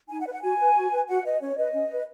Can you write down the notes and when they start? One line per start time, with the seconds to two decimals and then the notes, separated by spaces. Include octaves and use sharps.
0.09 D#4 G#5
0.20 F#5
0.26 B4
0.32 F#5
0.42 F#4 G#5
0.59 B4
0.76 F#4
0.91 B4
1.08 F#4 F#5
1.24 B4 D#5
1.40 C#4 C#5
1.57 B4 D#5
1.73 C#4
1.91 B4